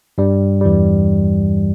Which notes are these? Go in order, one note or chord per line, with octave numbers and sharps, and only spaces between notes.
G2 G3
G3
E2 E3